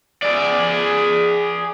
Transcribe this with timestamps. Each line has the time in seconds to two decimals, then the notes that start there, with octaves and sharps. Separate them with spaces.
0.22 G#4 D5